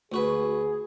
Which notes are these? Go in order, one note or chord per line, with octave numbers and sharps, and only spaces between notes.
D2 F#4 G#4 B4